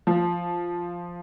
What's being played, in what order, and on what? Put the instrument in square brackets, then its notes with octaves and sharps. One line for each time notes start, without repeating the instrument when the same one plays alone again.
[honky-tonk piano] F3